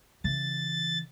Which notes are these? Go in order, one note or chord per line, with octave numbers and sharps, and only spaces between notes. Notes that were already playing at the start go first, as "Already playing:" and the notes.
C#3 E3 A6